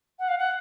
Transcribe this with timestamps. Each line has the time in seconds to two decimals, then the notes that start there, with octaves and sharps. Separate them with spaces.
0.19 F#5
0.28 F5
0.38 F#5